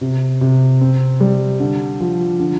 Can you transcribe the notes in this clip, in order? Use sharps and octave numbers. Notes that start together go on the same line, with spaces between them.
C3
C3
C4
G3
D3
F3
D3